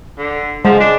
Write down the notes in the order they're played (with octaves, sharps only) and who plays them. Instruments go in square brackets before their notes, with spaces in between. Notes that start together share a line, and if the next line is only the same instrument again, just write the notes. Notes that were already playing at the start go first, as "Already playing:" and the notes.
[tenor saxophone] D3
[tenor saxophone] F3 [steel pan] G#3
[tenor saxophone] D4